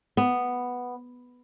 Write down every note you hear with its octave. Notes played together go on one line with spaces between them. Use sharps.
B3